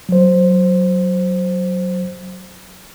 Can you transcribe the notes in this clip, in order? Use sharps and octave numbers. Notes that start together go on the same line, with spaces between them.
F#3 C5